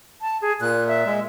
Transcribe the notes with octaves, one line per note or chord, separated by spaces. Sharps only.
A5
G#4
A#2 F#6
E5
G#3